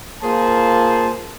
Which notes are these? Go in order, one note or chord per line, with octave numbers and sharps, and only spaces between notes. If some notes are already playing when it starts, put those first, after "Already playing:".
A#2 A#3 F4 G#4 C5 A5